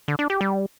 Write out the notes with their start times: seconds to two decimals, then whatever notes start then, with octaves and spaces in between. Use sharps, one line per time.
0.08 D3
0.19 D4
0.30 G4
0.41 G3